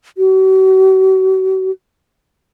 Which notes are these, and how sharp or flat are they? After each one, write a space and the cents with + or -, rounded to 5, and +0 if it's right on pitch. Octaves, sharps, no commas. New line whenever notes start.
F#4 +40